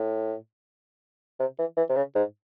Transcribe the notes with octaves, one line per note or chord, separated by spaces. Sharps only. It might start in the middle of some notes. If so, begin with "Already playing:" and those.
Already playing: A2
C3
E3
E3
C3
C#3
G#2